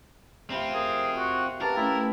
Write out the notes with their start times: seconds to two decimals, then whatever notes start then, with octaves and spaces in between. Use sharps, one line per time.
0.50 C3 C4 F4 G5 B5
0.74 G#4 A#4
1.17 F#4
1.61 G4 A#4 B4 F5 A5
1.77 A3 C#4 E4